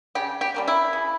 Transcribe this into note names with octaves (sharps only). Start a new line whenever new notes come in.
C#3 G4
G4
G3 A#3 C#4
E4
C#3